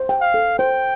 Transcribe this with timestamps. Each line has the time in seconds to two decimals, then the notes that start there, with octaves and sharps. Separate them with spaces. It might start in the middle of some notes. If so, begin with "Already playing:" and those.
Already playing: C5
0.09 G5
0.21 F5
0.34 A4
0.59 C5 G5